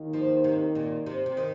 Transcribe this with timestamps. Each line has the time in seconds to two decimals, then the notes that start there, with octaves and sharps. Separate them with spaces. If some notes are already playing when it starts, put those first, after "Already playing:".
Already playing: D#2 D#3 A#3 D#4
0.13 F3
0.44 C3
0.75 A#2
1.06 C3
1.26 C3
1.37 D#3